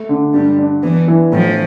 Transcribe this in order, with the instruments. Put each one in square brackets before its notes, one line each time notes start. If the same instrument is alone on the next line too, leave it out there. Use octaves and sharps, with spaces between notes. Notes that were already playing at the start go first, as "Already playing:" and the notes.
Already playing: [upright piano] A3
D3
[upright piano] G2 [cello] G3
[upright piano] D4
[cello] E3 [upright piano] B3
[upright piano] E3
[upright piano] A2 [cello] F3